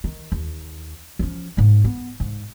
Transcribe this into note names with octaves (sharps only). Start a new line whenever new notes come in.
D#3
D#2
F3 C#4
G#2 A#3
B3
G#2